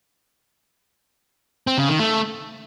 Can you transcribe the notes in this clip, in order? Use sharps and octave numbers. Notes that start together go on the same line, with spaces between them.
C4
C#3
D#3
A3